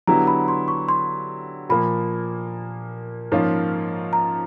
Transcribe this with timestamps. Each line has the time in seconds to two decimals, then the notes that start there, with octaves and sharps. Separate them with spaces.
0.07 D3 F#3 B3 E4 G4 A#5
0.27 B5
0.48 C6
0.68 C#6
0.89 C6
1.69 A#2 F3 A#3 B5
3.32 G#2 F3 A#3 C#4 F4
4.13 A#5